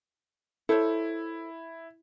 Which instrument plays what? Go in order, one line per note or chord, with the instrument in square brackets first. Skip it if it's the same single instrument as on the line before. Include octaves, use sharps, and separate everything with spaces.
[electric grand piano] E4 [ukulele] A4 C5 C#5